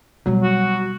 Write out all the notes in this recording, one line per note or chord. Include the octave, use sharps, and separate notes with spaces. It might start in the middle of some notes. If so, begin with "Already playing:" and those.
B2 F#3 G3
F#4